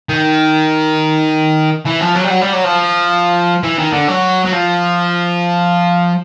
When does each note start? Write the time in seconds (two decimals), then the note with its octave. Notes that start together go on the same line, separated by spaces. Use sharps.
0.09 D#3
1.86 E3
2.01 F3
2.15 F#3
2.24 G3
2.30 F#3
2.41 G3
2.53 F#3
2.64 F3
3.64 E3
3.79 D#3
3.93 D3
4.08 F#3
4.45 F#3
4.53 F3